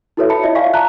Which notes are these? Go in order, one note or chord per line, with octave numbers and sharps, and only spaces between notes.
E4 F#4 A4 B4 C#5 E5
E5 A5 B5 C#7
E4 F4 C#5 D#5 E5
D5 F5 G#5 C#6 B6
E5 A5 A#5 F#6